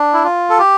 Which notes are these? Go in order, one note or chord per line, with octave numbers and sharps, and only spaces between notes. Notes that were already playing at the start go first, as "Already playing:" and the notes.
Already playing: D4
E4
F4
A4
G4